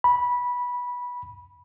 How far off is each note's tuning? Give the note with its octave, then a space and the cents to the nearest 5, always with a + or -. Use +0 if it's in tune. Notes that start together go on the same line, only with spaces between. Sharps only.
B5 -15